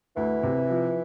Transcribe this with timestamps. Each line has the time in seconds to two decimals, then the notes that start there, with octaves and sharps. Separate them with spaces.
0.17 D2 E3
0.43 C3
0.70 F3